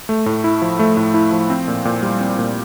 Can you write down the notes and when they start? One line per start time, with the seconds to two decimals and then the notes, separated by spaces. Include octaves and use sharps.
0.09 A3
0.26 A2
0.44 E4
0.62 F3
0.79 A3
0.97 A2
1.14 E4
1.32 F3
1.50 C4
1.68 A#2
1.85 A#2
2.03 G3
2.21 C4
2.39 A#2